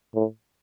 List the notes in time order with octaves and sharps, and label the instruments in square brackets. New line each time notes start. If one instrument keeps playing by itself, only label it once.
[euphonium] A2